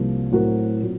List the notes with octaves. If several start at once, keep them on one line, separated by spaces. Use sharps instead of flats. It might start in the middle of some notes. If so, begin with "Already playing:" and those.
Already playing: C2 C3 F3 A#3 F4
A2 F#3 C4 F#4 A#4
A#2 F#3 C4